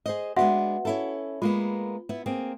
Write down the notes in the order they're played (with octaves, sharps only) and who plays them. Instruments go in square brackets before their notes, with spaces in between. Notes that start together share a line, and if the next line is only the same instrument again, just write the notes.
[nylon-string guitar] G#4 C5 D#5
[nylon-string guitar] G#3 B3 D4 [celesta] F#4 E5 F#5
[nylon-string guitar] C#4 E4 A4
[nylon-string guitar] G#3 A#3 B3 [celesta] F4
[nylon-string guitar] B3 E4
A#3 C4 G#4